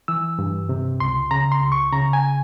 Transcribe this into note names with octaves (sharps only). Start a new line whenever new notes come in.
E3 E6
G2
C3
C#2 C6
C#3 A#5
C6
C#2
C#6
C#3 A#5
G#5